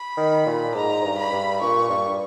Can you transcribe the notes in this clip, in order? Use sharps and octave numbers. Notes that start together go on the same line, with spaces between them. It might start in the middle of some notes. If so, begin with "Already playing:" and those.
Already playing: B5
D#3
A#2
G#2 A#5
G2
B5
G2
A#2 C#6
G2